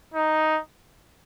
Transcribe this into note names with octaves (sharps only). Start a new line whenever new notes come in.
D#4